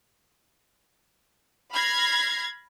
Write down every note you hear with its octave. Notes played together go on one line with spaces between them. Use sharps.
B5 F6 G#6 A#6 C7